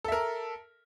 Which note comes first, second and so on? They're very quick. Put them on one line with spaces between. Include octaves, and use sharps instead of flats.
A4 E5 A#4